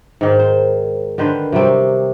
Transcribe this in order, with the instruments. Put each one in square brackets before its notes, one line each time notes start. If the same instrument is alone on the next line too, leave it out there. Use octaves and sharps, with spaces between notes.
[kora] G#2 D#3
C5
D3 D#3 B4 C5
C3 F#3 G3 C4